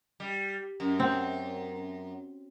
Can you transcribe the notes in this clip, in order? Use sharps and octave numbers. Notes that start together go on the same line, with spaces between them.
G3
F#2
C4